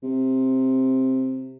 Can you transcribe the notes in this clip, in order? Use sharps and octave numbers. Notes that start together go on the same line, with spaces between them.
C3